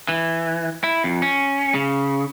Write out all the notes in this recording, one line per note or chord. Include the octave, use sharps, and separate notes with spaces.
E3
E4
F2
C#4
C#3